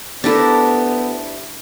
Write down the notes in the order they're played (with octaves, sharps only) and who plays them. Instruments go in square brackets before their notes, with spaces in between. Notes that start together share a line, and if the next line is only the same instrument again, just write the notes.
[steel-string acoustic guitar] D2 E4 G4 [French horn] B3 [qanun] D4 A4 A#4 [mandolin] A5